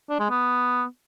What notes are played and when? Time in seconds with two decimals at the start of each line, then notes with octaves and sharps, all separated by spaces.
0.09 D4
0.20 G#3
0.30 B3